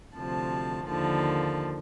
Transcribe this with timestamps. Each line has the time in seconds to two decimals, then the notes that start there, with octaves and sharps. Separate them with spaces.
0.17 D2 C3 F3 A5
0.87 D#2 D3 F3 A5